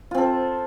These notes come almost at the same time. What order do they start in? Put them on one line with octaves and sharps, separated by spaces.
F4 C4 A4